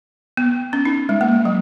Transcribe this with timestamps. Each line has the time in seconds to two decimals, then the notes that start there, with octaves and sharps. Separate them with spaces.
0.37 B3
0.73 C#4
0.85 D#4
1.09 G#3
1.21 A#3
1.32 G#3
1.45 F#3